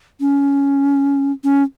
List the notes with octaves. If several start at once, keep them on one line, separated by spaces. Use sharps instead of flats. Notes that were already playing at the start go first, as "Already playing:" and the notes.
C#4
C#4